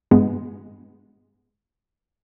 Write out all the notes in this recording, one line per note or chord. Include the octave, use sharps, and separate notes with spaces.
G2 G#3 B3